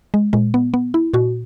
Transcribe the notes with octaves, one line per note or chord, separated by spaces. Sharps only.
G#3
A#2 G#3
B3
B3
E4
A#2 F#4